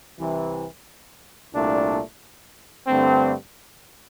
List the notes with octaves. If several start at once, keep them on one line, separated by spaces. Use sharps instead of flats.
C2 C3 E3
C2 A#2 A3 D4
G2 D3 A3 C4